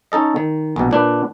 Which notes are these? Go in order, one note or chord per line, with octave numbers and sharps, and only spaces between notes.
C#4 D#4 A4 D#5
D#3
A#1 B2
A#2 D4 B4